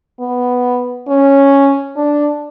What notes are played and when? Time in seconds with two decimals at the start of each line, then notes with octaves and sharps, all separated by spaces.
0.20 B3
1.08 C#4
1.97 D4